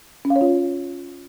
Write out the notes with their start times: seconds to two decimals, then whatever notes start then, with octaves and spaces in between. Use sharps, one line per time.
0.25 C#4
0.30 F5
0.36 C#5
0.41 F4